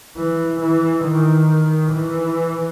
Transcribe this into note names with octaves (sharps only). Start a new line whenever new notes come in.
E3
E3
D#3
E3